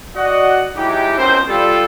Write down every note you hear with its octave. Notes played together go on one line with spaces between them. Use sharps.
F#4 D5 D#5 F#5
F#3 G#3 D#4 E4 G4
C#2 B2 C4 C#4 A#4 C5
G3 F4 A4